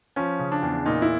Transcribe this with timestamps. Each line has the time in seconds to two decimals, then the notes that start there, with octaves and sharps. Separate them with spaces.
0.16 F3 C#4
0.39 C#3
0.52 D4
0.62 E2
0.86 A#2 D#4
1.02 E4